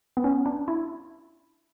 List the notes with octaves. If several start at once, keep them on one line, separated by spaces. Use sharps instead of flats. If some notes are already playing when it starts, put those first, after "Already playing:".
B3
C#4
D4
E4